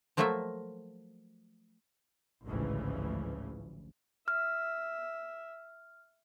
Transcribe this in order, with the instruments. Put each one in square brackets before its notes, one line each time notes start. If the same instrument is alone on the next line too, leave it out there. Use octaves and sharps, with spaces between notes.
[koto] F3 F#3 A3 A#3 F4 E5
[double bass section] A1 D2 G#2 C#3 E3 F3
[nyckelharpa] E5 [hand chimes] F6